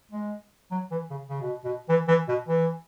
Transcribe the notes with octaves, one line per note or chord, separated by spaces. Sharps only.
G#3
F#3
E3
C#3
C#3
B2
B2
E3
E3
B2
E3